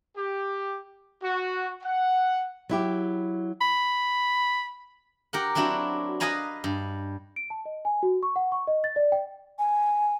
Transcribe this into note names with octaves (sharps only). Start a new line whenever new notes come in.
G4
F#4
F#5
F#3 E4 G4
B5
G4 A#4 F#5
F#3 C4 D4 E4 F#4
B4 D#5 F5 G#5 A#5 B5
G2
D7
A5
D#5
G#5
F#4
C#6
F#5
C#6
D#5
A6
D5
G5
G#5